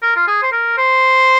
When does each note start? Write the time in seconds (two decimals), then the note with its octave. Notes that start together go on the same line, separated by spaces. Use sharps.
0.02 A#4
0.16 F4
0.27 G#4
0.42 C5
0.52 A#4
0.77 C5